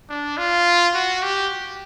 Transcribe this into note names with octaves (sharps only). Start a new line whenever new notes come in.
D4
F4
F#4
G4